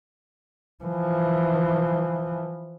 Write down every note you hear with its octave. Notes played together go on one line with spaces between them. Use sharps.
E3 F3